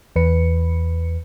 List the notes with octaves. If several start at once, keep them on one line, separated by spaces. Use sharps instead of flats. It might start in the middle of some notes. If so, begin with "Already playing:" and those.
E2 B4 C#7